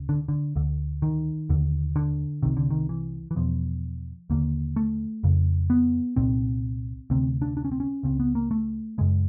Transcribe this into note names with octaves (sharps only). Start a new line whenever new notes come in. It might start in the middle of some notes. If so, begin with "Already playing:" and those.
Already playing: D2 C#3
D3
D3
D2 D3
D#3
D#2 D3
D3
C2 C3 D#3
D3
D#3
E3
E3
E2 B2 F3
D#2 D3 A#3
A3
F2 C#3
B3
C2 A#2 C4
D2 C3 C4
D4
D4
C#4
C4
C#4
C#2 C#3 C4
B3
A#3
A3
F#2 C#3 G#3